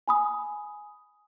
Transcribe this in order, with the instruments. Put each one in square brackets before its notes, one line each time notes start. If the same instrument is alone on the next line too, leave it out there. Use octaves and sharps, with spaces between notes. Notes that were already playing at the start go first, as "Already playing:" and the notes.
[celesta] G#5 B5 D#6